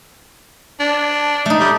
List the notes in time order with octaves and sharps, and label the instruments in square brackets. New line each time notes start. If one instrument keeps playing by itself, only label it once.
[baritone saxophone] D4
[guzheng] A3 D#4
[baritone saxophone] G3